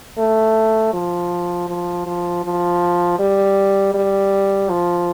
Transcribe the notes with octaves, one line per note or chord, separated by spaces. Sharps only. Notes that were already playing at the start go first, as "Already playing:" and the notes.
A3
F3
F3
F3
F3
G3
G3
F3